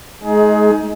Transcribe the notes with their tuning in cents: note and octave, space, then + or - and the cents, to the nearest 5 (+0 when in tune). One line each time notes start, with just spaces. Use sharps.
G#3 +35 D#4 +15 G#4 +20